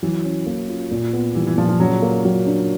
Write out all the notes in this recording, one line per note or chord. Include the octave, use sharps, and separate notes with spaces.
E3 F#3
C#4
A#3
F4
A#2
B3
E3 G3
E3
A#2 F3
F3
C#3 F#3
A#3
F#3
D4